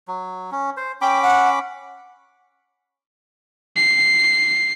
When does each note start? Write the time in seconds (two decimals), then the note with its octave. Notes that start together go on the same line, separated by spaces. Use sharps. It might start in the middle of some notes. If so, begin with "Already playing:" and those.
0.08 F#3
0.52 C#4
0.77 C5
1.02 C#4 G5 B5 D6
1.23 F#5
3.76 C7